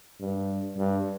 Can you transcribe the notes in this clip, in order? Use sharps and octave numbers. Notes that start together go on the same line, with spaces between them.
G2
G2